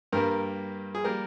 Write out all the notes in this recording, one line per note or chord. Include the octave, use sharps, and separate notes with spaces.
G2 G3 A#3 A#4
G#4
G3 A#3 A#4